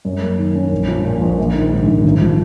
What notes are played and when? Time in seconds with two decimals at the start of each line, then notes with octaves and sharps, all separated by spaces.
0.05 F#2
0.22 A#3
0.38 D#3
0.55 C#4
0.72 A#1
0.88 F3
1.05 A#2
1.21 A#1
1.39 A#1
1.54 D#3
1.71 G#2
1.88 A#1
2.04 G#1
2.21 F3